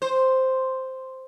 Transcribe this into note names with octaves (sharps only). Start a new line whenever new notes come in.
C5